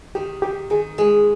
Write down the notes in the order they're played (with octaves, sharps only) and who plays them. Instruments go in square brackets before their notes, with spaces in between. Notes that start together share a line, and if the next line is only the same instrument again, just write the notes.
[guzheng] D#3 [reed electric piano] G4
[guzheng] D#3 [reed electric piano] G4
[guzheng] D#3 [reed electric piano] G#4
[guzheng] G#3 [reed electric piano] G#4